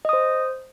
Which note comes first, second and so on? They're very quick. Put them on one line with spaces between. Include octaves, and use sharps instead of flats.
D#5 D#6 C5